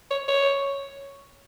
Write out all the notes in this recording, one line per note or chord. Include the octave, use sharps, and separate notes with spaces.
C#5
C#5